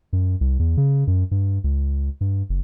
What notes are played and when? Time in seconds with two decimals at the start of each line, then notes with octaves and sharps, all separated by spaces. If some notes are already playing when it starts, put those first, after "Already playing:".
0.13 F#2
0.41 C2
0.59 E2
0.77 C#3
1.07 F#2
1.31 G2
1.64 C#2
2.21 G2
2.49 F#1